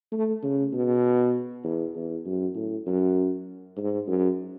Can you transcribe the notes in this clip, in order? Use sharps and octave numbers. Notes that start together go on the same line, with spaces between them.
A3
C#3
B2
E2
E2
F#2
A2
F#2
G#2
F#2